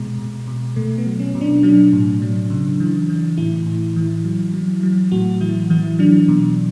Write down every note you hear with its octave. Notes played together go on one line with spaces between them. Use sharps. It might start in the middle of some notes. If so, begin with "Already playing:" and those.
Already playing: B2 G#3
B2
B2
B2 A3
B3
F#3
C#4
B2
D4
F#3 D4
A2
F#3
C#3
E3
E3
A2 E4
A2
E3
F#3
F#3
F#3
A2 F#4
E3 E4
E3 E4
F#3 D4
B2